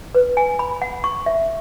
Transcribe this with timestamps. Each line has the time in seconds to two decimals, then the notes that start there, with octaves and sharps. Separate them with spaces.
0.15 B4
0.37 G#5
0.59 B5
0.82 F#5
1.04 C#6
1.26 E5